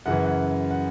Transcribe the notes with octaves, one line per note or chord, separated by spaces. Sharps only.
F#2 C#3 E3 F#5
F#5
F#5